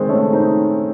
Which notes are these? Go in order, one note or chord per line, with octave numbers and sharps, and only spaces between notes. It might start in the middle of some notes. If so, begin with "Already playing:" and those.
Already playing: D#3 G#3 C4
A3 C#4
C4 D#4